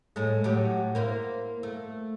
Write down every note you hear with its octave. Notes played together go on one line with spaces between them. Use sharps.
A2 G#3 A3
A2 F#3 G4
A#3 E4 C5
A3